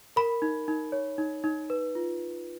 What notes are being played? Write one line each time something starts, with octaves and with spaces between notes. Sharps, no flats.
A#4 B5
D#4
D#4
C#5
D#4
D#4
B4
F4